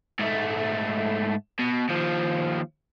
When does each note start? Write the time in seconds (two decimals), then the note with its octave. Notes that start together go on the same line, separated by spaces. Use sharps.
0.19 G#2 A3
1.59 B2
1.89 D#2 F3